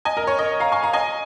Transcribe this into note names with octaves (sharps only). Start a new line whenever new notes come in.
D#5 G#5
A#4 D#5
C#5
A#4 D#5
F5 A#5
G#5 C#6
F5 A#5
D#5 G#5